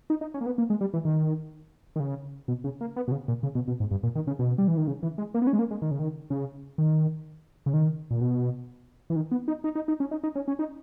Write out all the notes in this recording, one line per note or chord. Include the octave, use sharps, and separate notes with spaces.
D#4
D#4
C#4
A#3
B3
A#3
G#3
G3
E3
D#3
D#3
C#3
B2
C#3
A#3
B3
B2
C#3
A#2
C#3
B2
B2
G#2
G2
A#2
D#3
C#3
B2
G3
E3
D#3
C#3
E3
G#3
A#3
B3
C#4
G#3
A#3
G#3
D#3
C#3
D#3
C#3
D#3
C#3
D#3
A#2
B2
E3
D#3
B3
D#4
D#4
D#4
D#4
C#4
D#4
D#4
C#4
C#4
D#4